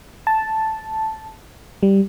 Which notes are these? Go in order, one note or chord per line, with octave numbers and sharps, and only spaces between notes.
A5
G3